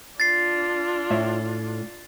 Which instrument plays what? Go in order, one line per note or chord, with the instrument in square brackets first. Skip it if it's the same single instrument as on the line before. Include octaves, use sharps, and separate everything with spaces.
[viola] D4 F4 [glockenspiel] A6 C7
[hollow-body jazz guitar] A2 E5